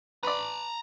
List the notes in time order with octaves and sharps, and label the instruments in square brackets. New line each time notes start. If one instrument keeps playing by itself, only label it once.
[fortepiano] B4 D5 [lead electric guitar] A#5 B5